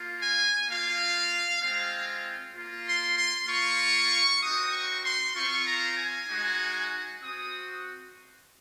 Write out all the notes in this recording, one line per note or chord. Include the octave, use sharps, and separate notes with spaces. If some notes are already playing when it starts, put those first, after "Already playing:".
Already playing: A#3 F4
G#5
A#3 F4 F5
G#3 C4 F4 F5
A#3 F4
C6
C6
A#3 F4 C#6
C4 D#4 F#4 D#6
C#6
C6
C4 F4 C#6
A#5
G#5
G#3 D#4 F#4
C4 F#4 D#6